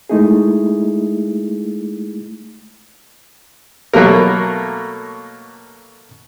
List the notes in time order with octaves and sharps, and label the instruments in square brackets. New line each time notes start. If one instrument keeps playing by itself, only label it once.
[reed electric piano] G#3 A3 D#4 E4 G#4
[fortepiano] B2 F#3 A3 A#3 A#4